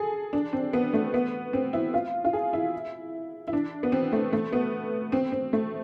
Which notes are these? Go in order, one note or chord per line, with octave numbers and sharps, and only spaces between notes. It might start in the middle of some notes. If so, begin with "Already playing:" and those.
Already playing: G#4 A4
D4
C4
B3
A3
B3
C4
E4
F4
F4
G#4
E4
E4
D4
B3
C4
A3
A3
B3
C4
C4
A3